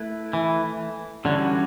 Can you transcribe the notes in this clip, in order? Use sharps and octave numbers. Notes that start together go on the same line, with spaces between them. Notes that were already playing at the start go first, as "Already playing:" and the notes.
Already playing: A3 E4 B4
E3
D3 E3 G3 C#4 F#4 C#5